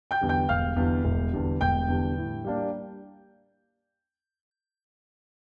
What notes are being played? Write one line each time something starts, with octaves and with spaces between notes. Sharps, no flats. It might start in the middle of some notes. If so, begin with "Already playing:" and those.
G5 G6
E2 D3 G3
G5 G6
E1 F5 F6
E2 D3 G3
E1
E2 D3 G3
E1 G5 G6
E2 D3 G3
A2
G3 A#3 D4